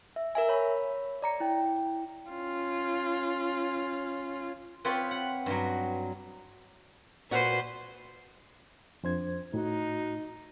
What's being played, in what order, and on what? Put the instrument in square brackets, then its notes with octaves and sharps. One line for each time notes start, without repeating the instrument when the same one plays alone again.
[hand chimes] E5
A#4 E5 G#5
C#5 B5
D5 A#5 C#7
E4 G5
[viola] C#4 F4
[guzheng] C4 F4 G4 B4 C#5
F#5
G2 F#3
[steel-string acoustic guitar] A#2 F#4 F#5 [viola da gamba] B4 C5
[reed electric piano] F2 C5 G#6 [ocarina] D4
[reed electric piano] A2 [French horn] D#4 [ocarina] F#4